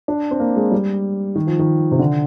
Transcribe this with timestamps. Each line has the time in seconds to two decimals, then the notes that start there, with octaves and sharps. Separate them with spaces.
0.08 D4
0.31 C4
0.40 A#3
0.56 G#3
0.72 G3
1.35 D#3
1.47 F3
1.59 D#3
1.92 C3
1.99 D3